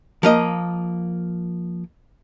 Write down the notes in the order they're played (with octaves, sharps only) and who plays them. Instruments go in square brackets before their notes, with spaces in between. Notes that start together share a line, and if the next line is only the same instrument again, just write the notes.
[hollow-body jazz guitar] F3 A#3 D#5